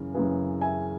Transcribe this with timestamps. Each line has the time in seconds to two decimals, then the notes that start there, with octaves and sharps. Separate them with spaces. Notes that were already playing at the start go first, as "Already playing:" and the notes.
Already playing: F#2 C#3 E3 G#4
0.14 F#2 C#3 E3 G#4 B4
0.61 E5 G#5